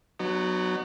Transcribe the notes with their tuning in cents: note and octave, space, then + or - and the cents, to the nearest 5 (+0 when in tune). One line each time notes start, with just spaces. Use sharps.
F#3 +0 B3 +0 D#4 -45